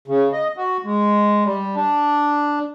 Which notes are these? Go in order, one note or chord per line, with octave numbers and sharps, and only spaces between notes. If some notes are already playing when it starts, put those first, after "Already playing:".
C#3
D#5
F#4
G#3
G3
D4